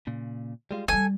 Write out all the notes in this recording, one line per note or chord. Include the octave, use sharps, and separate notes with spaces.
A#2 C#3
G3 G#3 F4
F#3 G3 A4 G#5